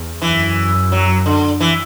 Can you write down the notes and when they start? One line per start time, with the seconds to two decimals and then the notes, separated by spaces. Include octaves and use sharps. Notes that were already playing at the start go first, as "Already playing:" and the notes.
Already playing: E2
0.22 F#2 E3
0.92 F#3
1.26 D3
1.60 E3